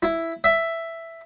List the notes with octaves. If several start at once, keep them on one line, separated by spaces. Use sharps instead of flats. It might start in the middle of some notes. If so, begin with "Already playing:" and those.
E4
E5